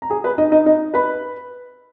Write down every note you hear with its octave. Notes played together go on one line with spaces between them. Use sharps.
A#5
G#4 G#5
B4 B5
D#4 D#5
D#4 D#5
D#4 D#5
B4 B5